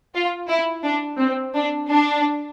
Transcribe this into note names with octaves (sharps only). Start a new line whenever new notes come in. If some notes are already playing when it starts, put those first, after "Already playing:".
F4
E4
D4
C4
D4
D4